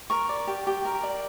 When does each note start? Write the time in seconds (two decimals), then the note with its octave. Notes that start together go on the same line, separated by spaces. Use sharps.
0.10 A#4 C#6
0.29 D5
0.47 G4
0.67 G4
0.85 A#4
1.03 D5